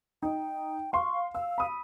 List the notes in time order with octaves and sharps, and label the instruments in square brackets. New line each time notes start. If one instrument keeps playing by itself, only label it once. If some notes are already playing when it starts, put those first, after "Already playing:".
[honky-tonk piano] D#4 [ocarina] G5
[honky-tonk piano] F5 C6 [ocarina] C#6
[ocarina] F5 [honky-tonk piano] E6
[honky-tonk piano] B5 D#6